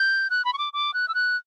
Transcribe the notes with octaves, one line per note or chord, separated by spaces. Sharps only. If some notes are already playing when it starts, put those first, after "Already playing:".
Already playing: G6
F#6
B5
C#6
D6
D6
F#6
E6
F#6